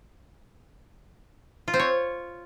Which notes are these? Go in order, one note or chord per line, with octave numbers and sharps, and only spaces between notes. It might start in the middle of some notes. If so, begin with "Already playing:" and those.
F4
C4
C#5